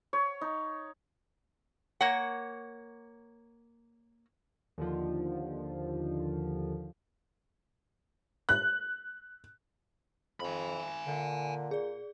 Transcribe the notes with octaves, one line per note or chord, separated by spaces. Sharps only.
C#5
D#4
A#3 C#5 F#5
D#2 D3 F3
F#6
F2 G#5 B5
A#2 D3
G#4 D5